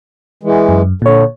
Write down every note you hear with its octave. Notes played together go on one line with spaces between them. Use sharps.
E3 G#3
F#2
A#2 D3 C#5